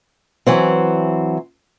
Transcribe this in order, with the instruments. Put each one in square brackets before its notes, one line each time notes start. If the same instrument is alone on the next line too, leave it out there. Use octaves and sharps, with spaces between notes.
[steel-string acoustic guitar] E3 F#3 C4